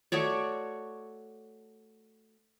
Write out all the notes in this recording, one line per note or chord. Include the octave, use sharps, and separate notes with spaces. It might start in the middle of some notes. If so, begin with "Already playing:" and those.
A3 F#4 C#5 D5